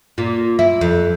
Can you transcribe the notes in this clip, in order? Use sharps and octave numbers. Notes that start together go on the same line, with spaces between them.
A#2
E4
F2